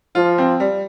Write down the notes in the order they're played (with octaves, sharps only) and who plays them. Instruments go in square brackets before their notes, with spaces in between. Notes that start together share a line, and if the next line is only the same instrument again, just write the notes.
[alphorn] F3 [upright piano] F4
[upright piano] C4
G3